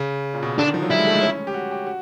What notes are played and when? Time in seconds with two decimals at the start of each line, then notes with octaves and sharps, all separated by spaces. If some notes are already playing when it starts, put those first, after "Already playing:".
Already playing: C#3
0.34 A#2
0.43 B2
0.58 D3 D4
0.67 D#3
0.74 F3
0.82 F#3
0.90 G3 E4
0.99 G#3
1.07 A3
1.15 G#3
1.22 C#4
1.47 G4
1.54 F#4
1.71 G4
1.86 F#4